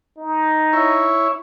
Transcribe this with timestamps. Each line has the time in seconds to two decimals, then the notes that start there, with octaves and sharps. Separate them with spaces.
0.18 D#4
0.73 E4 C#5